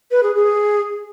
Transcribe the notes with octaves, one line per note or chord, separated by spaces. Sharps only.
B4
G#4
G#4